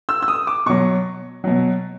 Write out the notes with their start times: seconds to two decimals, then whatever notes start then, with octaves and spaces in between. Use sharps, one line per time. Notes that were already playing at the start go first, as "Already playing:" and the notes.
0.09 E6
0.22 E6
0.28 D#6
0.47 D6
0.66 B2 F#3 C#6
1.44 B2 F#3